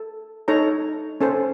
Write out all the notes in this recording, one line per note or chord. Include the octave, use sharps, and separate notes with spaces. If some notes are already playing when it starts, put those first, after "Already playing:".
Already playing: A4
D#4 A4 C#5 A#5
C#4 A4 C5